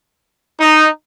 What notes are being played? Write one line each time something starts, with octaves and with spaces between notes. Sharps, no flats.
D#4